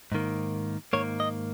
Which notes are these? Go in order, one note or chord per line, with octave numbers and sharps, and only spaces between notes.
G#2 D#3 A#3
G#2 D#3 A#3 C#5
D#5